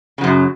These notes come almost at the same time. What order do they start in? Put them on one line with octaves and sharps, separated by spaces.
C#3 F#3 F#2